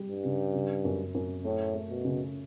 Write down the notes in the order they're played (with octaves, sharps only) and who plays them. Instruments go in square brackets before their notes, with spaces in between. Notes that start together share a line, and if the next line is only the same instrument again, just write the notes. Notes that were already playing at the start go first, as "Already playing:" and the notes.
Already playing: [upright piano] G3
[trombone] G2
[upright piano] C#3
C#3
F#2
F#2
[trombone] A2 [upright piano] A3
[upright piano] A3
[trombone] B2
[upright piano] C#3